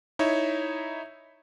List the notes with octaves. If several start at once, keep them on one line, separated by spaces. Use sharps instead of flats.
D#4 E4 C#5 E5